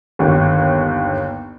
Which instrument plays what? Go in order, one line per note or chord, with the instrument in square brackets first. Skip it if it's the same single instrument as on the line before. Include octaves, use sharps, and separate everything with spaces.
[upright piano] G1 D#2